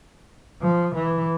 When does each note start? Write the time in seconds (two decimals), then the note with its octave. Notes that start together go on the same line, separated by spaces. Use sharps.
0.62 F3
0.95 E3